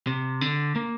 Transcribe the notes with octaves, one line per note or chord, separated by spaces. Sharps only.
C3
D3
A#3